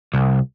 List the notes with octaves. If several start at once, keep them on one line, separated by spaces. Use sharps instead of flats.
C2